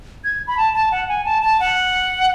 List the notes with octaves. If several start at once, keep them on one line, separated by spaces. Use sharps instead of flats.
G#6
B5
A5
A5
F#5
G#5
A5
A5
F#5